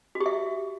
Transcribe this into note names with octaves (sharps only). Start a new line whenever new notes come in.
F#4
G4
E5